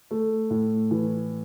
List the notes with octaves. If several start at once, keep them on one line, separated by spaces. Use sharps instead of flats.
A3
A2
E3